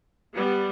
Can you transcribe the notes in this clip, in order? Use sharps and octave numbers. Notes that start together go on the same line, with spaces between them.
G3 B3